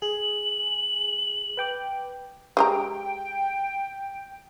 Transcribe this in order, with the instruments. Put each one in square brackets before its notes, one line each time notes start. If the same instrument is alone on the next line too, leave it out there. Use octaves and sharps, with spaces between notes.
[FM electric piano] G#4 [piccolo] F#7
[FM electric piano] B4 G5 D6
[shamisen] G#3 G4 A#5 [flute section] G5